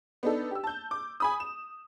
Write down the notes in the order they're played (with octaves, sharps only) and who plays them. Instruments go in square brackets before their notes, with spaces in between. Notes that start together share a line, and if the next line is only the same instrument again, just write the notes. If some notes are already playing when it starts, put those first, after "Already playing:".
[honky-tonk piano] B3 D4 D#4 A4
G4 E6
A5 G6
D6
G#5 B5 D#6
E7